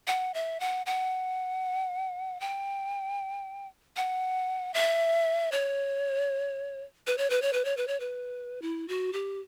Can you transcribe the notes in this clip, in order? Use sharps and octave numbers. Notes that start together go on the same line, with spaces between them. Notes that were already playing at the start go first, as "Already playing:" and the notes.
F#5
E5
F#5
F#5
G5
F#5
E5
C#5
B4
C#5
B4
C#5
B4
C#5
B4
C#5
B4
E4
F#4
G4